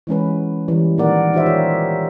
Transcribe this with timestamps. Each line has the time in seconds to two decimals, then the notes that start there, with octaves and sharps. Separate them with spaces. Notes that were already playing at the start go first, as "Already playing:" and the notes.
0.07 E3 G#3 C#4 B4
0.68 E3 G3
0.98 A#2 D#3 A#3 A#4 D5 F#5
1.33 D#4 F4 G4 C5 E5
1.46 D#4 F4 G4 C#5